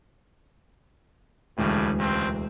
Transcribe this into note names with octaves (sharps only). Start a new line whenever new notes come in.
E1 D2 A2 C#3 G3
C#2 G2 C4